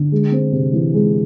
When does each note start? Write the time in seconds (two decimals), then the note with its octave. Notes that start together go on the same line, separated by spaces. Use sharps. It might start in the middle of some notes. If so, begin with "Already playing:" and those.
Already playing: D3
0.12 G#3
0.32 C4
0.52 C3
0.73 E3
0.94 G#3